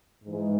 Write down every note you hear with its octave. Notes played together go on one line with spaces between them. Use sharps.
G#2 E3 G#3